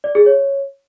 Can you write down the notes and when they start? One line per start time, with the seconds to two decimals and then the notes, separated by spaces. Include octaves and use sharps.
0.04 D5
0.15 G#4
0.26 C#5